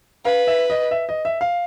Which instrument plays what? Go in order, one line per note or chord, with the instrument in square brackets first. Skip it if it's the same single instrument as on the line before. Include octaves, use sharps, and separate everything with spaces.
[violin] B4 [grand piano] F5
[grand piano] E5
D#5
E5
D#5
E5
F5